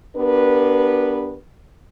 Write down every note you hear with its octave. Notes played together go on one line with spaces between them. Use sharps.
B3 D4 G4 A#4 B4